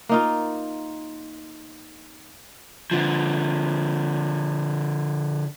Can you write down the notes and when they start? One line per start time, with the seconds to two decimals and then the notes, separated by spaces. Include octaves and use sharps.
0.09 A#3 D#4 F4
2.91 D3 F3